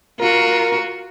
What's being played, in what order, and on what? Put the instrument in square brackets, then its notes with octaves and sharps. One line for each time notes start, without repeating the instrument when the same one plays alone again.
[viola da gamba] F4 F#4 [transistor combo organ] A#4